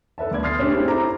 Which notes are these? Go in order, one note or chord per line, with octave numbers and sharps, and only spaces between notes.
A4 B4 E5 A5
D2 B3 D5 G#6
C6 D#6 F6 A6 C7
A3 C#4 D4 G4
A3 C4 D4 E4 G#4
E4 A4 C5 A#5 D6